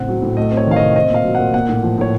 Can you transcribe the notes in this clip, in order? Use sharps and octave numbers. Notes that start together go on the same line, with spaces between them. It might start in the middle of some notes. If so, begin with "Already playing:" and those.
Already playing: A2 C#3 C4 F#5
F#3
A2
A3 D#5
C4
C#5
D#3 F5
C3 D#5
C4 D#5
A#2 F5
F#3
A#2 F#5
A#3 F#5
A2
F3
A2 C#5